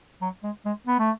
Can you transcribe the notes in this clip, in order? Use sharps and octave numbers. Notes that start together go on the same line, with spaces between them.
F#3
G#3
G#3
B3
A3